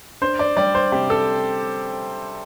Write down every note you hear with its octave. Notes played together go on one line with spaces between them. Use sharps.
D4 C5
D5
G3 D5
C5
C3 G4
A4